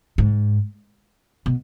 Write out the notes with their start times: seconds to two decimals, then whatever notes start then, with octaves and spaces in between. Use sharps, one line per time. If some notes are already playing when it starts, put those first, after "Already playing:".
0.18 G#2
1.46 B2